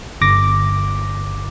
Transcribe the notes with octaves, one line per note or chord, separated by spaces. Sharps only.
G1 D6 A#6